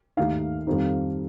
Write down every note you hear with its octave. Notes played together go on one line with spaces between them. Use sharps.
D#2 D#3 A3 D#4 F5
F2 D#3 G3 C4 D#4